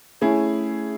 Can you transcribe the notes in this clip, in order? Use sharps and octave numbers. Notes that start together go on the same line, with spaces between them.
A3 C#4 E4 G#4